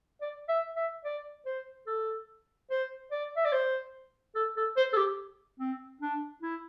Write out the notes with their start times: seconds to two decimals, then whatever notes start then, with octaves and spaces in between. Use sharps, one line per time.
0.21 D5
0.49 E5
0.76 E5
1.04 D5
1.46 C5
1.87 A4
2.70 C5
3.11 D5
3.36 E5
3.45 D5
3.52 C5
4.35 A4
4.57 A4
4.77 C5
4.93 A4
4.97 G4
5.60 C4
6.01 D4
6.42 E4